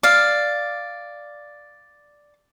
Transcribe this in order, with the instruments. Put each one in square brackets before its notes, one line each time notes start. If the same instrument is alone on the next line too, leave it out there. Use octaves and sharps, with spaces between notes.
[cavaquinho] D5 F5